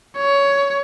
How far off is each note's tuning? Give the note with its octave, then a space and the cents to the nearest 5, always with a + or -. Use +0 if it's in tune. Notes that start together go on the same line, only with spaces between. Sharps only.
C#5 +15